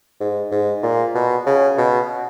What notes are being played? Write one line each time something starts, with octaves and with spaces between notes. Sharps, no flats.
G#2
G#2
A#2
B2
C#3
B2